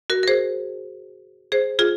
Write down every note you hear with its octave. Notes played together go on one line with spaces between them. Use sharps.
F#4 A#4
A#4
G#4 C5
G#4 C5
F4 G#4